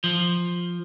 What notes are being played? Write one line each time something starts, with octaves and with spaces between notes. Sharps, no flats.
F3